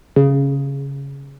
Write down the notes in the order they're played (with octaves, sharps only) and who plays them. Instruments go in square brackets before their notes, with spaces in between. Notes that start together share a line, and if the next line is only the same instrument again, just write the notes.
[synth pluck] C#3